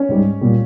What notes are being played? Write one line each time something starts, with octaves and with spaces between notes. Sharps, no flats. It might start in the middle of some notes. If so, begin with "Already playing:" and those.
Already playing: C#4 C#5
G#2 G3
A#2 G3